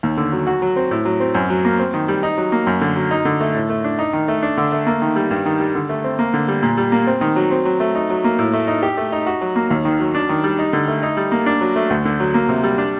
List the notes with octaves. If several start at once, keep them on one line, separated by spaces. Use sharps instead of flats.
D#2
D3
F#3
F#4
F#3
C4
A2
F#3
C4
F#2
F#3
A#3
C4
D#3
G3
D#4
F#3
A#3
F#2
D3
F#3
D#4
D3
A3
A2
A3
D4
D#4
D#3
A3
D4
D3
A3
A#3
D#3
G3
G2
D#3
G3
D3
A3
C4
A#3
D3
G3
A#2
G3
A#3
C4
D#3
F#3
C4
F#3
A3
D#4
F#3
A#3
A2
A3
D#4
G4
A3
D#4
F#4
F#3
A#3
D#2
D#3
F#3
D4
D#3
G3
D#4
D3
A3
D#4
G3
A#3
D4
F#3
A3
D2
D3
F#3
A#3
C3
G3
D4